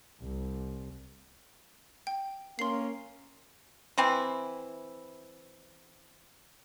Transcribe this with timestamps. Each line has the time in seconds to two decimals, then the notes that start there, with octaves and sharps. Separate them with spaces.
0.22 C2
2.07 G5
2.59 A#3 C#4 A#4 C6 C7
3.98 E3 C4 E4